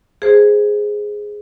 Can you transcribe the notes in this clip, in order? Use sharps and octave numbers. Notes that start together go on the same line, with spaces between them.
G#4 C5